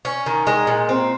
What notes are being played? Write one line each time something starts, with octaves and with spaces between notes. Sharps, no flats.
C#4
D#3
G#3
A#2
C4